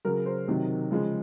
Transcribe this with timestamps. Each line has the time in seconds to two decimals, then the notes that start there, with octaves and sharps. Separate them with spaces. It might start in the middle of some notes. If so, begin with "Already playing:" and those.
0.05 C#3 F#3 A#4
0.26 C5
0.48 C3 D#3 F#3
0.91 C#3 F3 G#3